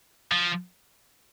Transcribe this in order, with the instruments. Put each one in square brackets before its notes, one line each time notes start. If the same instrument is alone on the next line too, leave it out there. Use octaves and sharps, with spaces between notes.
[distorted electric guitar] F3